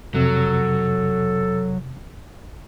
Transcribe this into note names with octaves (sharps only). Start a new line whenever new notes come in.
F2 C3 F#3 A4